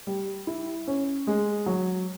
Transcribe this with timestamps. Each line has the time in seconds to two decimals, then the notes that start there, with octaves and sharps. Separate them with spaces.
0.07 G3
0.47 E4
0.87 C#4
1.27 G#3
1.66 F#3